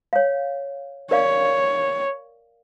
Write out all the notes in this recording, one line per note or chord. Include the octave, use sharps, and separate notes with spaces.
C#5 F5
A#4 C#5 D5 F5